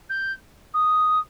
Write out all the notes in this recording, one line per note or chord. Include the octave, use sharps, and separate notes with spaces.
G6
D#6